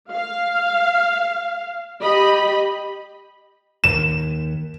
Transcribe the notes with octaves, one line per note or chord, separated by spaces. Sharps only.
F5
G4 D#5 B5
D#2 E7